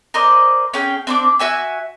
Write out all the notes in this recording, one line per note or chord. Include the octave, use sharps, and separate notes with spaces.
A#4 C5 D5 D#5
C#4 G#4 G5
C4 D4 D6
F#4 E5 G#5 E6